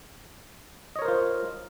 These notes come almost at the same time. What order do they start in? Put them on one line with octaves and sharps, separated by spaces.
D#5 C#5 A#4 C5 F4